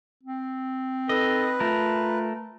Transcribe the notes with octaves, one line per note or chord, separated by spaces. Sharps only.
C4
D#4 A4 B4 D#5
A3 F4 A#4